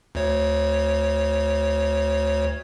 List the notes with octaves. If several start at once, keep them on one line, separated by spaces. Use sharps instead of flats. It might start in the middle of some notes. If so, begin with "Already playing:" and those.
D2 C#5